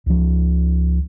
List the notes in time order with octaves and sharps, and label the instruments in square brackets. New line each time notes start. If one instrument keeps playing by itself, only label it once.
[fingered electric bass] C#2 F3